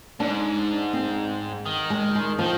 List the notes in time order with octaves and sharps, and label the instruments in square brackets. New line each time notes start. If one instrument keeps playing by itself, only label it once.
[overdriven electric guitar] G#2 [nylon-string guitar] D4
[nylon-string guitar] C4
[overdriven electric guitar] D#3
[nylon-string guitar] G#3
G#3
[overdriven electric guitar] D#3 [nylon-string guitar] F3